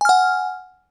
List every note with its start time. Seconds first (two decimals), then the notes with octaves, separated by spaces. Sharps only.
0.01 G#5
0.05 F6
0.09 F#5